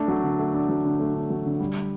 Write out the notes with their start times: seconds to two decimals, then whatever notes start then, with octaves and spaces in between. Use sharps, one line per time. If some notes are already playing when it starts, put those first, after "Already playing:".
Already playing: A3 D4
0.08 F#3
0.24 D3
0.39 A3
0.54 D4
0.69 F#3
0.85 D3
0.99 A3
1.14 D4
1.30 F#3
1.46 D3
1.60 G3